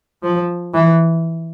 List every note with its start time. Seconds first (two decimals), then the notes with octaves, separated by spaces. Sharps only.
0.22 F3
0.74 E3